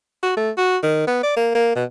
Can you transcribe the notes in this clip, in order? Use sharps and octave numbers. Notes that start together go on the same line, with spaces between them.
F#4
A3
F#4
D#3
B3
D5
A#3
A#3
B2